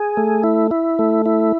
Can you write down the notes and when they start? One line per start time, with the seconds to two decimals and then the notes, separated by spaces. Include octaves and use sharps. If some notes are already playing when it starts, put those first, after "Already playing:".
Already playing: G#4
0.17 A3
0.44 E4
0.71 E4
0.99 A3
1.26 E4